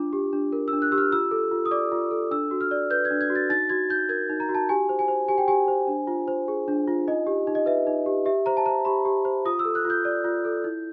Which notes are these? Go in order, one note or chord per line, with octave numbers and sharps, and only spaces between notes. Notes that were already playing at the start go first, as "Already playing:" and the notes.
Already playing: D4 F4 D6
G4
D4
A#4
E6
D4
F#6
G4 E6
F6
F4 E6
A4
F4
D#6
D5 D6
F4
A4
D4 E6
F#4
F6
D5
B4 G6
G#6
D4
G#6
F#4
A6
D#4 A6
F#4 G#6
D#4 G6
A#4 G#6
D#4
A#5
F#4
A5
G4 G#5
C5
G#5
C5
G4 G#5
G5
G4 G#5
C5
D4
F4
C5
G#4
D4
F4
D#4 D#5
G4
D#4
D#5
B4 E5
D#4
G4
G4 E5
C5 A#5
A5
C5 A#5
G4 B5
G4
C5
F4 D#6
E6
A4
F#6
F4
G6
D5
F4
A4
E4